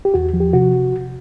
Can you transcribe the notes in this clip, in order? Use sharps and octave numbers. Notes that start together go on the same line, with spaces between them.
G4
E2 F#4
F3
G4
C3 F#4